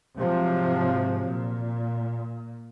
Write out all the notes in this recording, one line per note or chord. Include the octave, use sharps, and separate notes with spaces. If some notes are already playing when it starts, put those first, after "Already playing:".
G#2 C3 F3 F#3
A#2